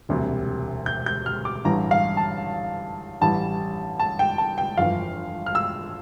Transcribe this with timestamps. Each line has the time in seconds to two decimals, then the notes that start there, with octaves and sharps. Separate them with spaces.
0.09 E1 D2 C3 G3
0.86 G6
1.06 G6
1.26 F6
1.45 D6
1.65 A1 G2 E3 A#5
1.91 F5
2.17 A5
3.21 A1 G2 E3 G3 A5
4.00 A5
4.19 G5
4.38 A5
4.58 G5
4.78 G1 F2 E3 F5
5.46 F6
5.55 E6